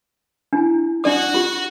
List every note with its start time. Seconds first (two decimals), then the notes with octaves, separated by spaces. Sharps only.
0.53 D4 E4 G#5
1.04 D4 F#4 D5 F#5 D#6
1.34 F4 G4